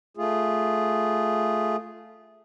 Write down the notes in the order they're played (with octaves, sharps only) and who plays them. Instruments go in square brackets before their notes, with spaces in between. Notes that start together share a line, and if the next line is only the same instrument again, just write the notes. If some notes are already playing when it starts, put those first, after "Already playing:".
[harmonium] A3 F4 G#4